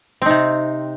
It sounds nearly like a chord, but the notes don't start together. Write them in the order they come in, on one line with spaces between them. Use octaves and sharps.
C4 D#4 C3